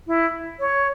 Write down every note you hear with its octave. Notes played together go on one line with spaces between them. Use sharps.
E4
C#5